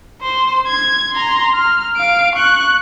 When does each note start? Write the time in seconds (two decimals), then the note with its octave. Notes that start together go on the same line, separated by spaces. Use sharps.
0.22 C5 C6
0.68 G#6
1.12 A#5 C6
1.55 F6
1.97 F5 D7
2.36 C#6 F#6